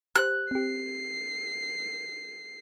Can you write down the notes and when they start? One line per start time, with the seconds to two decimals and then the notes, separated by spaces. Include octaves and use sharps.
0.16 G4 C5 F#6
0.51 C4 G4 C7